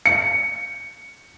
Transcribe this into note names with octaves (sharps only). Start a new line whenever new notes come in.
C#7